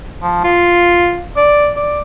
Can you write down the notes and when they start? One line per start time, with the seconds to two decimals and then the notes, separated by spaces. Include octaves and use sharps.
0.23 F3
0.44 F4
1.36 D5
1.76 D5